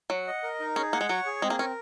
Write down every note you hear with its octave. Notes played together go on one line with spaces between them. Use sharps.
F#3 F#5
D#5
A#4
D#4
C#4 G#4
A#3 F#5
G#3
F#3 C#5
G#4
G#3 C4
A#3
C#4 A#4